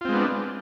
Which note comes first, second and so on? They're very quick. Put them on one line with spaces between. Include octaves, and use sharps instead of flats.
F4 C4 G#3 B3 D4